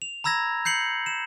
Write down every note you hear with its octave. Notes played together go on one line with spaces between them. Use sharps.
F7
A#5 B5 E6 G#6 A#6
G6 C7 C#7 F#7
E7